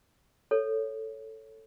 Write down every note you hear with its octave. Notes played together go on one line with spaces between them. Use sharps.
A4 C#5